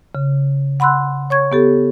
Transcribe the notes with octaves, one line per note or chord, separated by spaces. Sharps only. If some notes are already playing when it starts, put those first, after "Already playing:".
C#3
F#5 B5 C6 E6 F#6
C#5 C#6 G#6
B3 G4 A4